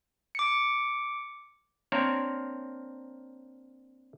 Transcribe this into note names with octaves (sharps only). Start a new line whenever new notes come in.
D6 C#7
A#3 C4 D4 A#4 C5 C#5